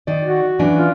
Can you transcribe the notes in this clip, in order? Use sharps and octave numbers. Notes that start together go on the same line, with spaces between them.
D#3 D5
F#4
E3 C#4 D4
F4